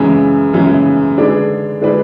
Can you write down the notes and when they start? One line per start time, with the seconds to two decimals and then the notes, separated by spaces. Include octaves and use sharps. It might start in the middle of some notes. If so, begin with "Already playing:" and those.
Already playing: F#2 C#3 E3 G#3
0.53 F#2 C#3 E3 G#3
1.18 D3 G#3 D4 G#4 B4
1.81 D3 G#3 D4 G#4 B4